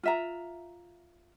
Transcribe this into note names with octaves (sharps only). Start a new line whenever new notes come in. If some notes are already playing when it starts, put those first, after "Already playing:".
F4 E5 A#5